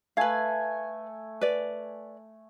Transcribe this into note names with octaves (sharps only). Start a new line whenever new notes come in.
A3 B4 F5 G#5 A5
B4 D5